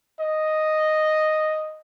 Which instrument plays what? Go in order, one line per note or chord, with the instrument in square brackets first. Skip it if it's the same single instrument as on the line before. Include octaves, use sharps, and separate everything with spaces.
[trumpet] D#5